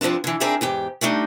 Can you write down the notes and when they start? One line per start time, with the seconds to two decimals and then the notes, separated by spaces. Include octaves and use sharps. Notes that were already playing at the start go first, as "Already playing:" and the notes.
0.01 G2 F3 G#3 C4 D4
0.24 D3 E3
0.40 C4 D4 D#4 G#4 A#4 E5
0.61 E2 G#2 G4
1.01 G3 A3 D4 D#4